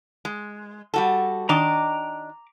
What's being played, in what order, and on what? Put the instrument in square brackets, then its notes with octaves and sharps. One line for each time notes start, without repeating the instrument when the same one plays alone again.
[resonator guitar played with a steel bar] G#3
G3 F#4 A4
[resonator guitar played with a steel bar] D#3 D4 D#5 [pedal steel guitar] A#5 D6